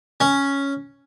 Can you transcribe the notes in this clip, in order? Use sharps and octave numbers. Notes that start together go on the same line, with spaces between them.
C#4